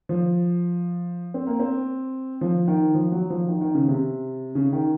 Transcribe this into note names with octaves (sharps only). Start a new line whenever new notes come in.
F3
C4
A#3
C4
F3
D#3
F3
F#3
F3
D#3
D#3
C#3
C3
C#3
D#3